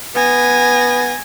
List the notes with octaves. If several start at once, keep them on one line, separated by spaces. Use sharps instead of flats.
B3 G#5 A#6